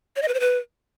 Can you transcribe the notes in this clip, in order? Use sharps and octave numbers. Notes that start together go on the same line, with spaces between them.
C#5
D#5
B4
C5
B4